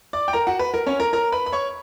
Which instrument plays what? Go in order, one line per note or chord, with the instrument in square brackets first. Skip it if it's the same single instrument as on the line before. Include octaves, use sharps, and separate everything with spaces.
[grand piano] D5 D6
G5
A#4 A#5
F#4 F#5
B4
A#4
C#4 C#5
A#4 A#5
A#4 A#5
B4 B5
B5
C#5 C#6